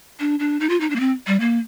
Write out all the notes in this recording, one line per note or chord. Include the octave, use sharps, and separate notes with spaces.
D4
D4
D#4
F4
D#4
D4
A#3
C4
G3
A#3